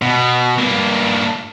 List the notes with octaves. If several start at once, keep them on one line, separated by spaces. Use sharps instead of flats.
B2
G2 A#3